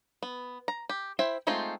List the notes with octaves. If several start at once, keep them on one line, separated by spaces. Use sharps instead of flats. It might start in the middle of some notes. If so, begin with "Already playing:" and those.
B3
A#5
G4
E4 C5 E5 G5
G#3 A3 C4 D#4 F4